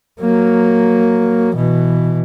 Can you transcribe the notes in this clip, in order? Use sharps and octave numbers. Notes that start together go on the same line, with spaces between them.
F#3 A#3
B2 E3